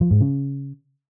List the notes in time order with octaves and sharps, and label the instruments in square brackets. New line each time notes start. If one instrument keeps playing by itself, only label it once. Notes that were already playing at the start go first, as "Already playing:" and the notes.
[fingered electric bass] F3
G#2
C#3